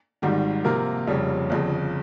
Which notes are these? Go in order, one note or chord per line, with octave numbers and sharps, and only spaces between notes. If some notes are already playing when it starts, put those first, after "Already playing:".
G#1 G#2 D#3 G3
C3 F3 A#3 F4 A#4
F1 F2 C#3 G3 C#4
G1 F2 C#3